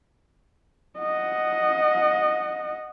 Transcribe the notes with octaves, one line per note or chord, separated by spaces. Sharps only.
D#5 F#5